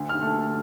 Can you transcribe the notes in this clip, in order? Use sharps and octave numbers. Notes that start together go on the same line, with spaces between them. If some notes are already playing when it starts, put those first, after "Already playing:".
Already playing: D2
F6
A3